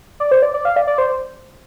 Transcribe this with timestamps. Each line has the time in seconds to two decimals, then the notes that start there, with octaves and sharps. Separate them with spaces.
0.20 D5
0.31 C5
0.43 D5
0.54 D5
0.65 F5
0.76 D5
0.87 D5
0.98 C5